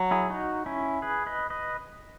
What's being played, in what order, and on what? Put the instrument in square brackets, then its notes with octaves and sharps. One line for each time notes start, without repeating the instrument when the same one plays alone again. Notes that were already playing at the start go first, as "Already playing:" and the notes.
Already playing: [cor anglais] F#3
[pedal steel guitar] E4 G#4
D#4 F#4
C#4 E4
G#4 B4
B4 D#5
B4 D#5